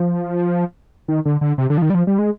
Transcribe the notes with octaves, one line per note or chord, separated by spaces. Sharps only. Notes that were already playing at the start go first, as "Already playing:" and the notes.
Already playing: F3
D#3
D3
D3
C3
D3
F3
D#3
G3
F3
G3
G#3